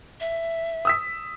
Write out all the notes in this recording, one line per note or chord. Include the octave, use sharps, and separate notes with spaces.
E5
D#6 E6 B6